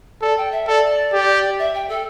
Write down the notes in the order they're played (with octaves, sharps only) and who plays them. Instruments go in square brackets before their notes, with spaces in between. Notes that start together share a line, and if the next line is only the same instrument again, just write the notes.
[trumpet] A4 [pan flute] D5
[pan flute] G5
E5
[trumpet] A4 [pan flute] D5
[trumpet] G4
[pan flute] E5
G5
A4